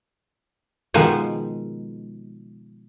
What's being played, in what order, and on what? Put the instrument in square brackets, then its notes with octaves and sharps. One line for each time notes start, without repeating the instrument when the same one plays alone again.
[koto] B2 D#3 F3 G#3